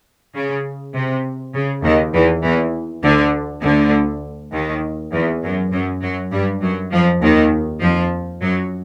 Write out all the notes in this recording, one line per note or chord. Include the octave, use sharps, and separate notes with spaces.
C#3
C3
C#3
D#2 D#3
E2 E3
E2 E3
D2 D3
D2 D3
D#2 D#3
E2 E3
F#2 F#3
F#2 F#3
F#2 F#3
G2 G3
F#2 F#3
F2 F3
D#2 D#3
F2 F3
F#2 F#3